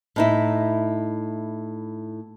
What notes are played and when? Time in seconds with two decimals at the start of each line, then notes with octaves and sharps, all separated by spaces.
0.16 A2 D#4 E4